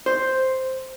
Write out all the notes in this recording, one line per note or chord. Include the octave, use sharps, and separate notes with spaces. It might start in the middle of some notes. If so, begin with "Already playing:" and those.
C5